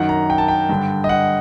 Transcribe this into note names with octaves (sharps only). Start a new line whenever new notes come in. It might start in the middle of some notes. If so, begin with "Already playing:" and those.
Already playing: F#2 D#3 F#5
A#5
G5
A5
G5
G2 D3
D#5
F#5